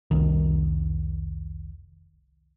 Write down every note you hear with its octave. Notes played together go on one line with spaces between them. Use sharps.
F1 C2 D#3